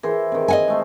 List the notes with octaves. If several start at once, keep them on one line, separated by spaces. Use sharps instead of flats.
E3 G#4 A#4 C5
C3 D#3
D#5 F#5 G#5
G#3 A3 C5